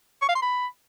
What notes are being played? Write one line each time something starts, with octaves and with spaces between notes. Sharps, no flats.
C#6
F5
C6
B5